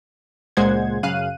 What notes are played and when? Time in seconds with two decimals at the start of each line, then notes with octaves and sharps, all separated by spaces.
0.57 C#2 A#2 G#3 C5 F#5 G#6
1.03 F#2 C#3 F5 F#6 D#7